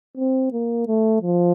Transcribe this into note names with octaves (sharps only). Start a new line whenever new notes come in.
C4
A#3
A3
F3